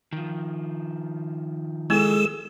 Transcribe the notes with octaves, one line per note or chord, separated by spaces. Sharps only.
D#3 F3
G#3 B3 E4 G#4 A4 E6